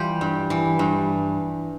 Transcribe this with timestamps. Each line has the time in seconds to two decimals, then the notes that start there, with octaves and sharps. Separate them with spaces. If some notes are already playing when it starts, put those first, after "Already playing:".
Already playing: E3 G3 F4 G4
0.21 G2
0.50 E3
0.79 G2